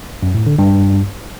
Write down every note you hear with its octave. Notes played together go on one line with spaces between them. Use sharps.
F#2
A2
D3
G2